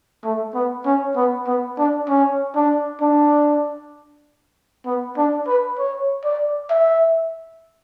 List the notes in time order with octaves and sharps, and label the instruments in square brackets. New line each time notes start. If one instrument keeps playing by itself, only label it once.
[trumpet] A3
B3
C#4
B3
B3
D4
C#4
D4
D4
B3
D4
B4
C#5
D5
E5